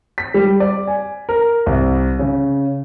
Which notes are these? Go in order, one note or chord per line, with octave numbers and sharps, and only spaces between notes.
B6
G3
D5
G#5
A#4
C2
C#3